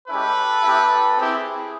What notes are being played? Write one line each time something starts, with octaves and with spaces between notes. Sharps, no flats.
G#3 C#4 E4 G4 A4 B4
B3 E4 G4
C4 E4 G4 G#4